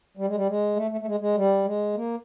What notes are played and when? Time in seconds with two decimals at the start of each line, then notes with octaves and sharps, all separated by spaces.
0.17 G3
0.27 G#3
0.35 G3
0.47 G#3
0.76 A3
0.91 A3
1.01 A3
1.06 G#3
1.20 G#3
1.35 G3
1.64 G#3
1.95 A#3